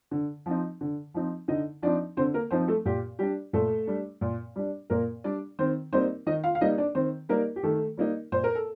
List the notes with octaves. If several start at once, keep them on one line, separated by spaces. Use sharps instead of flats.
D3
F3 C4 D#4
D3
F3 C4 D#4
D3 D#4 D#5
F3 C4 D4 D#4 D5
D3 C4 C5
A#3 A#4
F3 C4 D#4 C5
A3 A4
A#2 G4
G3 D4 G4
A#2 A3 A4
G3 D4
A#2
G3 D4
A#2 A#3 A#4
G3 D4 D5
D#3 C4 C5
G3 A#3 C4 D#4 C5
D#3 D#4 D#5
F4 F5
F5
G3 A#3 D#4 D#5
D4 D5
D#3 C4 C5
G3 A#3 D#4 A#4
G4
D#3 A3 A4
G3 A#3 D#4
A#2 C5
A#4
A4